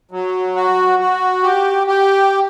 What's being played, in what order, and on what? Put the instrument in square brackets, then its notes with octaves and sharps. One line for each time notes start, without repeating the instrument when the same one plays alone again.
[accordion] F#3
F#4
F#4
G4
G4